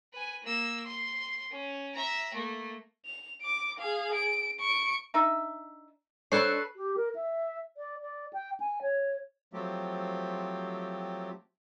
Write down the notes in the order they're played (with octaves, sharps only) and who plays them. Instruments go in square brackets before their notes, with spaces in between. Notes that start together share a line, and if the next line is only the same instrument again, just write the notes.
[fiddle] B4 G#5
A#3 E6
C6
C#4
E5 A#5
A3 A#3
[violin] F7
D6 D7
G#4 F5
D7
C#6 D7
[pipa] D4 D#4 E5
[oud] C4 D4 [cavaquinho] A4 B4 C#6 [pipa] C#5 [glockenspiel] F#6 C7
[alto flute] G4
A#4
E5
D5
D5
G5
G#5
C#5
[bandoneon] F3 F#3 A3 C4 G4